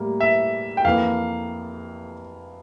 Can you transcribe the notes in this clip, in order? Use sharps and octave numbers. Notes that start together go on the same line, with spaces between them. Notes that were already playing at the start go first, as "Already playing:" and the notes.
Already playing: A2 G3 A#3
E5
G5
F2 E3 A#3 F5